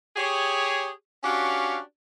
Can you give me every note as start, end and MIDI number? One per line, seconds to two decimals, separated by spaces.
0.16 0.89 67
0.16 0.89 68
0.16 0.89 73
1.24 1.79 61
1.24 1.79 62
1.24 1.79 66
1.24 1.79 67
1.24 1.79 73
1.24 1.79 77